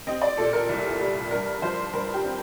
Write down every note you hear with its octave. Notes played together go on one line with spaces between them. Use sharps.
C4 D#5
D5
A#2 A4
A#4
C2
G3
G2 A#4
F3 C5
G2 A#4
G4
C4